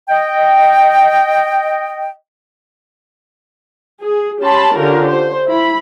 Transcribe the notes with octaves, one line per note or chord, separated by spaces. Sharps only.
D#5 G5
G#4
C#4 G4 A5 B5 C6
D3 C#4 F4 G4 A#4
C5
E4 B5